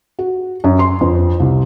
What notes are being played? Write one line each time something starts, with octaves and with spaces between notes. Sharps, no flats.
F#4
F#2
C6
F2
C2